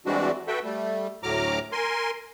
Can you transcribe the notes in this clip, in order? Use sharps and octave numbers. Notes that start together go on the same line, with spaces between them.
E3 G3 G#3 C4 D4 F#4
F#4 A4 B4 E5 G5
G3 A3
D2 A2 F#3 A#5 D6 F6
A#4 G#5 C6